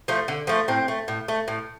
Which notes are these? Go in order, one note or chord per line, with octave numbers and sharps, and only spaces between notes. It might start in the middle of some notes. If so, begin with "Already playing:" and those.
F3 A3
D3
F3 A3
A2 C4
A3
A2
A3
A2